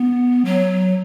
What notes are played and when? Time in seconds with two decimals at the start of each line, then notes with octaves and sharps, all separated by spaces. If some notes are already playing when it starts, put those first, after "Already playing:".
Already playing: B3
0.45 F#3